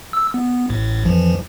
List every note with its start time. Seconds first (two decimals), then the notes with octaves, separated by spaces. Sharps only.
0.13 E6
0.34 B3
0.70 A1 A2
1.05 F2 E3 F3